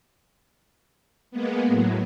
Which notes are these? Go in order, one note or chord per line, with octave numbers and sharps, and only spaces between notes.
G#3 A#3 B3
A2 F#3